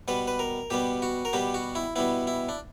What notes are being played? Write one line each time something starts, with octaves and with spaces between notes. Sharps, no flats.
B2 G3 B3 B4
B4
A#4
B2 G3 B3 G4
F#4
A#4
B2 G3 B3 G4
F#4
E4
B2 G3 B3 E4
E4
D4